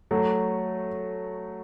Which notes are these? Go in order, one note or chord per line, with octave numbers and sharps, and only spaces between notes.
F#3 A3